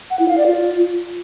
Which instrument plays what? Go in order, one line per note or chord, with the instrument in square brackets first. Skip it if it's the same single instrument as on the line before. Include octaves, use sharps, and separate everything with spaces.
[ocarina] F#5
E4
F5
D5
F4